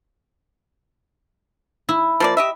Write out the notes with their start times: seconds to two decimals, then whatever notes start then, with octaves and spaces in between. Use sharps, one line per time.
1.89 E4
2.20 F3 A#3 D5
2.37 G4 D#5 E5